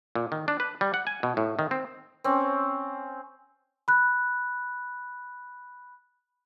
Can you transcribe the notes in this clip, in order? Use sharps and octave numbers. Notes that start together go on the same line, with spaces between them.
A#2
D#3
D4
B4
G3
F#5
G#5
B2
A2
D#3
C4
C4 C#4
B5 F#6